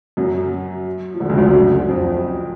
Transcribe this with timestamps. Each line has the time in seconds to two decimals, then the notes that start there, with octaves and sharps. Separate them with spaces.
0.17 F#2 F#3
1.14 F3
1.20 D2 D3
1.29 C#2 C#3
1.37 D2 D3
1.46 F#2 F#3
1.89 F2 F3